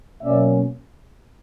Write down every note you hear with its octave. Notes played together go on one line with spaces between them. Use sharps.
B2 F#3 A#3 C#4 D5 E5